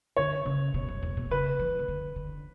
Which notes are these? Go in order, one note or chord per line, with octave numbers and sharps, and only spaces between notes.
D3 C#5
C#3
B2
F#2
E2
B2
C#3 B4
E3
C#3
D3
D3